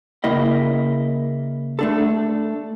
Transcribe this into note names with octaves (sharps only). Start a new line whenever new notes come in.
C#3 A#3 E4 D#5
A3 D4 A4